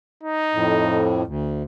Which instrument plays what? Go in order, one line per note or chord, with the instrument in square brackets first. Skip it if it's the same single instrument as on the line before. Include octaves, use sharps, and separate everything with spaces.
[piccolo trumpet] D#4
[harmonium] F2 A2
D2